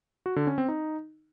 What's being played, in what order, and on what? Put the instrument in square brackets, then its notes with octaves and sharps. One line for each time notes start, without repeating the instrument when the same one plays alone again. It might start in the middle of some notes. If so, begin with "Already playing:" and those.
[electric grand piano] F#4
D3
C#4
C4
D#4